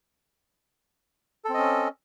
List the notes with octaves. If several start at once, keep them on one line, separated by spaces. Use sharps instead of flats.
C4 C#4 A4 D#5